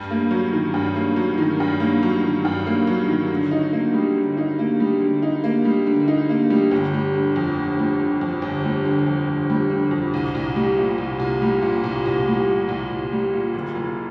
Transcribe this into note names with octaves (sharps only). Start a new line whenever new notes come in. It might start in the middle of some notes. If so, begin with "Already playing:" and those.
Already playing: G2
A#3
F#3
D#3
G2
A#3
F#3
D#3
G2
A#3
F#3
D#3
G2
A#3
F#3
D#3
D3
D#4
A#3
G3
D3
D#4
A#3
G3
D3
D#4
A#3
G3
D3
D#4
A#3
G3
G1
G3
D3
F2
G1
G3
D3
F2
G1
G3
D3
F2
G1
G3
D3
F2
C2
C2
G3
A#2
C2
C2
G3
A#2
C2
C2
G3
A#2
C2
C2
G3
A#2
F#1
F#1